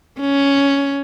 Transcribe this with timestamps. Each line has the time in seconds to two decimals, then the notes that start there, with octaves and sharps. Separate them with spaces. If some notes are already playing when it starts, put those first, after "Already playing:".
0.21 C#4